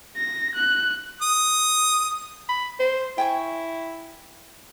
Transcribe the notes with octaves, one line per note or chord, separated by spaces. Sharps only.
A#6
F#6
D#6
B5
C5
E4 G5 G#5 C#6